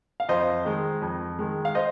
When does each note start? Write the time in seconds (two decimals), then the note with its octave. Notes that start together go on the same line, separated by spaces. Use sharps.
0.20 F5
0.29 F2 C5 D#5
0.65 D#3 G#3
1.02 F2
1.39 D#3 G#3
1.65 F5
1.75 C5 D#5